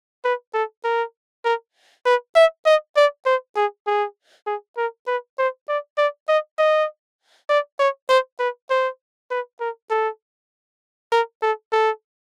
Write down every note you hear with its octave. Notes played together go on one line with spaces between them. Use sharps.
B4
A4
A#4
A#4
B4
E5
D#5
D5
C5
G#4
G#4
G#4
A#4
B4
C5
D5
D5
D#5
D#5
D5
C#5
C5
B4
C5
B4
A#4
A4
A#4
A4
A4